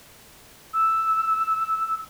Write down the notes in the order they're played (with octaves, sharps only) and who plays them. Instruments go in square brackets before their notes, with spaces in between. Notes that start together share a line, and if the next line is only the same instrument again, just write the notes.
[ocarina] E6